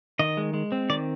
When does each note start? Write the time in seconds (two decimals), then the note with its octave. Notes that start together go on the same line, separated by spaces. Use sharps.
0.19 D#3 D#5
0.37 G#3
0.54 G#3
0.72 C4
0.90 D#3 D5